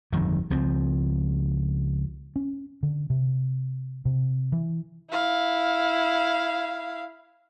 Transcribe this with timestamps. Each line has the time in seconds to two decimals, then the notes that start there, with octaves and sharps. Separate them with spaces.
0.13 G1 F2 D#3
0.50 C#2 F3 C4
2.36 C#4
2.83 D3
3.10 C3
4.05 C3
4.52 E3
5.10 E4 F5